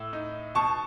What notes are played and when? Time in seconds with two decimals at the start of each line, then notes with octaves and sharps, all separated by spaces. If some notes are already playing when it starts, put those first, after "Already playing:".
Already playing: A2 E6
0.13 D#4
0.55 B2 A5 C#6